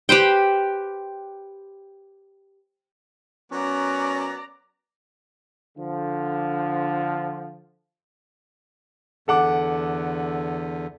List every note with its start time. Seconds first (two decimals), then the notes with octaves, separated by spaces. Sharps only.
0.09 G4 B4 C5 G5
3.52 F#3 B3 C#4 A#4 D5 A#5
5.78 D3 F3
9.28 E2 D3 A4 F#5 D6